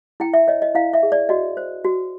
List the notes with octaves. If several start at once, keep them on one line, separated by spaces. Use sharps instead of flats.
E4 G5
E5
C#5 D#5
D#5
E4 F5
E5
G#4
D5
F#4 D#5
C5
F#4